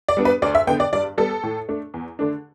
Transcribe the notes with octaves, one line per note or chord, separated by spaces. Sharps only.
D5
G3 B3 D4
B4
D2 D5
E5
D3 B3 G5
D5
G2 D5
G3 B3 A4
A2
A3 D4
E2
D3 A3 D4